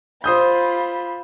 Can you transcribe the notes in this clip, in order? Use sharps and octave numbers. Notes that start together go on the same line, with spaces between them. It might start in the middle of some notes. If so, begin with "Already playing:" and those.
F4 C5 B5 D#6 G6